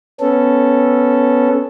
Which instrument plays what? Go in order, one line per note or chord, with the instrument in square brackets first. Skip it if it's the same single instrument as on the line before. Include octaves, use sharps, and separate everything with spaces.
[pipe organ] B3 C#4 A4